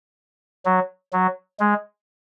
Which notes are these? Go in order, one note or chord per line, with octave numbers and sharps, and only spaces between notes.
F#3
F#3
G#3